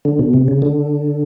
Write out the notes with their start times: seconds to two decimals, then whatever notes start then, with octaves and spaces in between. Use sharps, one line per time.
0.05 D3
0.19 B2
0.33 C3
0.48 C#3
0.62 D3